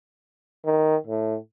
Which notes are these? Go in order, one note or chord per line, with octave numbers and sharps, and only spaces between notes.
D#3
A2